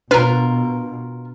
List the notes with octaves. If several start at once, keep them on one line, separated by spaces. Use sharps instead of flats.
B2 D4 F4 A#4 B4 F6